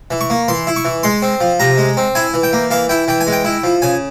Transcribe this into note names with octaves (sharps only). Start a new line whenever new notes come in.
E3
C#6
A#3
E3 C6
E4
C#6
E3
G#3 C6
C4
F3
C3 A#5
G#3
C4
E4 G#5
E3
G5
A#3
E3 F5
E4 G5
E3 G5
G#5
G#3
G5
E4
F3
C#3 G#5